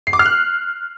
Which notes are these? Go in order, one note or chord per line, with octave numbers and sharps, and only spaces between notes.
C7
D6
F6
F#6